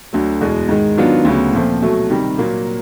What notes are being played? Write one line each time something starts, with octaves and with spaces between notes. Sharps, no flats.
D2 D3 F#3
E2 B2 G#3
G#2 D#3 G#3
D#3 F#3 B3 D4 F4
D2 C#3 F#3 B3
A#2 F3 A3 C4
B2 F#3 A3
C3 D#3 G3
A#2 F#3 A#3